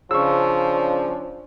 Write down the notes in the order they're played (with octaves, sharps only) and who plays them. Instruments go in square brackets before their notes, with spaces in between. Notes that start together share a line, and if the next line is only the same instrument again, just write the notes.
[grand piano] C#3 [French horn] F3 [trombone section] C#4 D4 [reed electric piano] C#6 E6